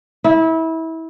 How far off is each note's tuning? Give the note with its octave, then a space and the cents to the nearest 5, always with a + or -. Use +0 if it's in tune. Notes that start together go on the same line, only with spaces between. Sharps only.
E4 -25